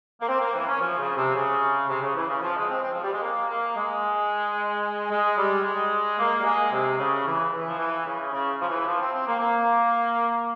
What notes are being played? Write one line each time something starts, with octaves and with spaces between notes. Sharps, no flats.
A#3
C4
A#3
E3
C#4
F3
C#3
C3
C#3
C3
C#3
E3
C#3
F3
G#3
C4
C4
F3
G3
G#3
A#3
A#3
G#3
G#3
G3
G#3
A#3
G3
G#3
C3
C#3
E3
E3
F3
E3
C#3
C#3
F3
E3
F3
C4
C4
A#3
A#3